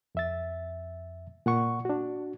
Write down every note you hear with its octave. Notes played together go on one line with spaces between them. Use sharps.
F2 E5 A6
A#2 F#5 C#6
D4 F#4